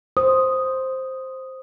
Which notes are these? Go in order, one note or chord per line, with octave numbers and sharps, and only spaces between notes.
C5 D#6